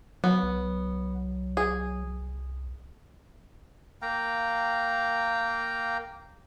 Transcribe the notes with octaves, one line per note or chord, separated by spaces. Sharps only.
F#3 B3
C2
G#4
A#3 F5 G5 A#5